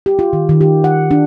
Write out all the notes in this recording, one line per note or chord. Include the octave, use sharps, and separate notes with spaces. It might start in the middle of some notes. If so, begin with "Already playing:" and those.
G4
F4
D#3
D#3
G4
F#5
D4